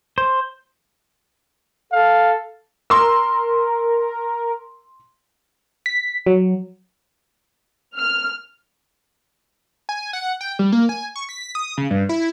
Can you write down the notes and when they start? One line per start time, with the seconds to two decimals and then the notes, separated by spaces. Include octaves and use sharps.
0.18 C5
1.92 A4 F5
2.90 A#4 C6 E6
5.86 B6
6.26 F#3
7.97 F6
9.89 G#5
10.13 F#5
10.41 G5
10.59 G3
10.72 A#3
10.89 G#5
11.16 C#6
11.29 B6
11.55 D#6
11.77 C#3
11.91 G2
12.09 E4